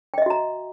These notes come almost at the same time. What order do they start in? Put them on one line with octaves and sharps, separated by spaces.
G5 D#5 E5 F#4 A#5